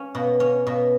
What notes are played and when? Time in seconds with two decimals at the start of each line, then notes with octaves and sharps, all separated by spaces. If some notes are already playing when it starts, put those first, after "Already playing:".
Already playing: C#4
0.15 B2
0.40 C#4
0.67 B2